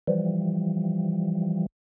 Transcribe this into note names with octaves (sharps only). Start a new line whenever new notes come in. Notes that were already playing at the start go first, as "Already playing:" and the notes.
E3 F3 G3